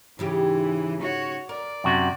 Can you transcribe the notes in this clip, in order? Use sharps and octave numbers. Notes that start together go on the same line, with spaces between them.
G#2 C#3 E3 G4
F#4 C#5
A#4 D5
F#2 C3 F#4